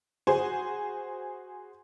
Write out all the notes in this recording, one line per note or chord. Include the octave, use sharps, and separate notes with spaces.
F#4 G#4 C5 G#5